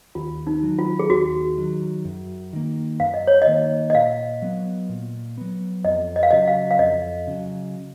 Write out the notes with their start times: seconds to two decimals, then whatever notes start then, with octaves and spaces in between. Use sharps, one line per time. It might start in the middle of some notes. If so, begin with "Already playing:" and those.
0.15 D#2 F4
0.47 D#4
0.63 D#3 F#3
0.78 F4
0.99 G#4
1.10 D#2 F#4
1.57 D#3 F#3
2.05 F#2
2.53 D#3 A#3
3.00 F#2 F5
3.14 D#5
3.27 C#5
3.42 D#5
3.47 D#3 A#3
3.90 D#5
3.95 A#2 F5
4.42 F#3 B3
4.89 A#2
5.37 F#3 B3
5.85 F2 D#5
6.16 D#5
6.23 F5
6.31 C#3 F#3 D#5
6.48 F5
6.71 F5
6.79 F2 D#5
7.27 C#3 F#3